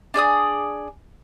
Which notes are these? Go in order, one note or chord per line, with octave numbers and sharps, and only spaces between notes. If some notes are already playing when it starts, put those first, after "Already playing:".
D4 G#4 D5 D#6